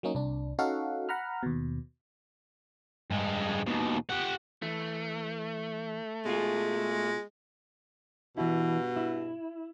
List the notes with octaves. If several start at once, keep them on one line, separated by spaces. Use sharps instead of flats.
F#3 A#3 C#4 D#4
C2 D4
C#4 D#4 F#4 A4 F5 F#5
F#5 A#5 B5 F6
D#2 B2
G2 G#3
D#2 B2
G4 F#5
E3 A3
B2 G#3 F4 G#4
G2 B2 E3 E4
E4